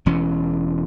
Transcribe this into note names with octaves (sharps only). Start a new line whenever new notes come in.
E1 E3 C#4